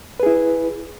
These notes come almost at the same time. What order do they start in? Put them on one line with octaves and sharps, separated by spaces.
B4 G#4 E4